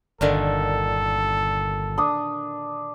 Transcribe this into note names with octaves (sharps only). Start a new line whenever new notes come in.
G1 A#2 D3 D#3 A4
D4 D#6